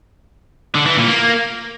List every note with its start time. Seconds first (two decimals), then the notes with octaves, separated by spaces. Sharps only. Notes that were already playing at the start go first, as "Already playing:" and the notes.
0.75 D3
0.86 E3
0.97 A#2
1.08 A#3